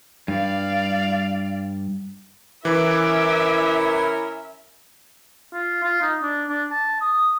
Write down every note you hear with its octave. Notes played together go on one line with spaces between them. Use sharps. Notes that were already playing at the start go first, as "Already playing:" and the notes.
G2 D5 F5
E3 C#4 E4 A#4 B4 E5 D6
F4
F4
D#4
D4
D4
A5
D#6